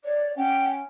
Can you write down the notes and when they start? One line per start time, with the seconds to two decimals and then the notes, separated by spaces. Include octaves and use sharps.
0.04 C#5 D5
0.37 C#4 F#5 G5